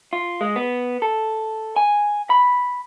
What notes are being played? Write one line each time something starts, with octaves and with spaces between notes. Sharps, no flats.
F4
G#3
B3
A4
G#5
B5